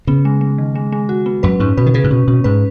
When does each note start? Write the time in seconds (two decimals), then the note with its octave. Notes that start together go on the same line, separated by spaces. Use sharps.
0.07 C#3 B3
0.25 G#3
0.41 G#3
0.58 D#3
0.75 G#3
0.92 G#3
1.09 F#4
1.26 B3
1.43 F#2 B4
1.60 G#2 C#4
1.77 B2 B4
1.86 D#3
1.94 C#3 B4
2.04 G#2
2.11 B2 C#4
2.28 B2 C#4
2.44 G#2 B4